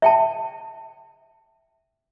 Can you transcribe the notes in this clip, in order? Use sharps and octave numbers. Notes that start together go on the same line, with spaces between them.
E5 G5 A5